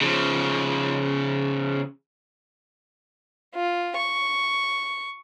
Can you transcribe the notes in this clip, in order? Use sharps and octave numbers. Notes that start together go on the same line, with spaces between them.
C#3 F3
F4
C#6